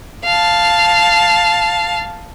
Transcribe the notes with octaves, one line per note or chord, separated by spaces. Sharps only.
F5 A5